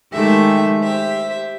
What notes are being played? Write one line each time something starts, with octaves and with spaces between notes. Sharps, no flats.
D#3 G#3 A3 G4 E5
G4 C5 E5